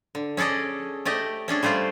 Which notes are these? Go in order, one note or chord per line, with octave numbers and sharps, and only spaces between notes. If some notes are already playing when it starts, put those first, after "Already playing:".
D3
C#4 G#4 A4 D5 D#5
A3 G4 D5 D#5
C#4 D4 G#4 A4
G3 A3 F4 C5 D5